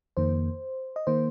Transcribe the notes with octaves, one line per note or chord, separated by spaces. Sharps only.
F2 D#3 A#3 C5
D#5
D#3 A#3 C5